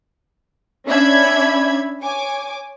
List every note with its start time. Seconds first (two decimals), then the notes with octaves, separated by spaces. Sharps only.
0.87 C#4 D4 E5 B5 G#6
2.02 C#5 G#5 D6